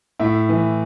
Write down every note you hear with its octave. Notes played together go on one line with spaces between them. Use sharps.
A2 E5
E3